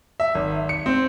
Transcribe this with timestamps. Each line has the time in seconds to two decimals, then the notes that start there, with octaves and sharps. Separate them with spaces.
0.20 E5
0.35 G#1
0.69 C#7
0.86 C4